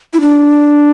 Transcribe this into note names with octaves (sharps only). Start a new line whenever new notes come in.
E4
D4